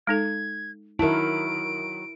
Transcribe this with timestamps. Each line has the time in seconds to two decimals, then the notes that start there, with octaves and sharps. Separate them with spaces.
0.07 G#3 D#4 A4 G#6
0.99 D#3 F#3 E4 A#4 A5 D7